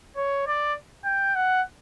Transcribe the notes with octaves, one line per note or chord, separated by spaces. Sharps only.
C#5
D5
G5
F#5